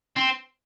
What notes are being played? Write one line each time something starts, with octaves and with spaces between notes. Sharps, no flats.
C4